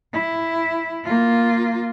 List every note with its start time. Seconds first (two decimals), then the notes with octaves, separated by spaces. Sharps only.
0.13 E4
1.05 A#3 F4